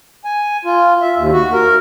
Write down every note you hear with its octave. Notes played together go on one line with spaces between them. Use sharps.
G#5
F4
E5
D#2
F#4
A#4